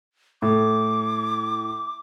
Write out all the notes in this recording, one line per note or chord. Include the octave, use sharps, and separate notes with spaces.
A2 D6